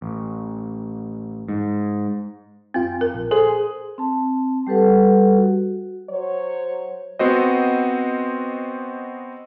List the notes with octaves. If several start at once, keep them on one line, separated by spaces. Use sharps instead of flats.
A1
G#2
F#2 C4 F4 G5
A#4
A#1
G#4 A4 C5
C4 A5
G3 G4 A4 B4 F#5
F#4
F#3 C5 C#5
B3 C4 F#4 C5 D#5